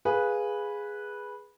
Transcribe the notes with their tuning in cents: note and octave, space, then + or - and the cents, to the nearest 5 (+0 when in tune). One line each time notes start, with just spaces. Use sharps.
G#4 -5 B4 -10 F5 +10